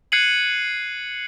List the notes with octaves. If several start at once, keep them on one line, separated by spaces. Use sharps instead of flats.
F#6 G#6 C7 C#7 D#7 F#7